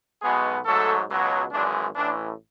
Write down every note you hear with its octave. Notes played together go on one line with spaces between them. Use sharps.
B1 B2 G#3 B3 G#4
G#2 F#3 A3 A4
C#2 B2 F#3
G#1 F#2 E3 G#3 D4
A1 A2 E3 D4